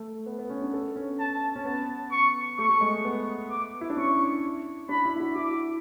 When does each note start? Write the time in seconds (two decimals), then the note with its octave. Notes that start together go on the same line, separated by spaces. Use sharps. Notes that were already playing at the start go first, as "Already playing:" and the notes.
Already playing: A3
0.26 B3
0.39 B3
0.50 C#4
0.61 D4
0.73 A4
0.96 C#4
1.20 A5
1.56 C#4
1.65 B3 A5
2.12 C#6
2.58 A3 C#6
2.69 A3
2.81 G#3
3.05 B3
3.51 D6
3.81 E4
3.90 D4
3.97 C#4 C#6
4.89 D4 B5
5.05 E4
5.16 E4
5.20 F#4
5.35 E4 D6